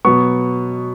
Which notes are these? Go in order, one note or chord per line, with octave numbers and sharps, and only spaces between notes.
B2 F#3 B3 C#6